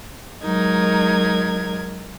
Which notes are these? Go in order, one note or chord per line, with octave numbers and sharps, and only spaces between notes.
F#3 G#3 D#4 A#4 G#6